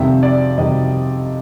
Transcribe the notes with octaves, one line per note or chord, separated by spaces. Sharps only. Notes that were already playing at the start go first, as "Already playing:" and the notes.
Already playing: F2 C3 D#3 G3 E5
D5
F2 C3 D#3 G3 D#5